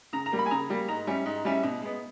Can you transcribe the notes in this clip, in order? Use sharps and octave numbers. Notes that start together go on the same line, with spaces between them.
C#3 A#5
A#5
G3 A#3
B5
G#5
C#3 A#5
G3 A#3
G#2 A#5
G3 C#4 E4
G#2
G3 C#4 E4
B2
G#3 B3